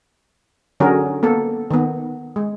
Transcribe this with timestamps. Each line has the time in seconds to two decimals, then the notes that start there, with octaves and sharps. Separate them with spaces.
0.80 D3 F#3 C#4 F#4 G#4 A#4
1.23 A#3 B3 A4
1.71 D#3 B3
2.36 G#3